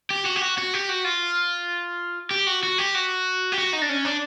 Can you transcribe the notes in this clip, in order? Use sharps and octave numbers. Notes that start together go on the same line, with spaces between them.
G4
F#4
G4
F#4
F#4
G4
F#4
F4
G4
F#4
F#4
G4
F#4
G4
F#4
D#4
D4
C#4
D4